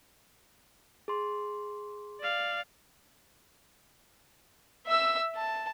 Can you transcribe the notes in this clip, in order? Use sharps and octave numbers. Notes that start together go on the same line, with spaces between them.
G#4 C6
D5 F5
E5 E6
A5